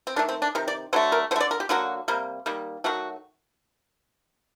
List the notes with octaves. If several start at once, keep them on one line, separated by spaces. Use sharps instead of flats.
C4
D#3 A3 D4
C4
D4
C3 D#3
D5
D3 F#3 A3 C5
A#4
D3 A3 C5
D5
A#4
G4
D3 F#3 A#3 F#4
C3 G3 A#3
D#3 G3 A#3
D#3 F#3 A3 F#4